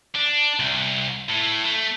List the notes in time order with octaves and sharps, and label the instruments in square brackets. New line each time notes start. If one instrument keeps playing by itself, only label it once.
[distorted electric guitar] D4
C2
A2
A3